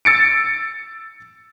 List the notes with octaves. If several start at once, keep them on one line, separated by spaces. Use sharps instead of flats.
E6 A6 C#7 D7